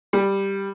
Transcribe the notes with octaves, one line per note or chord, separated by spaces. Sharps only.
G3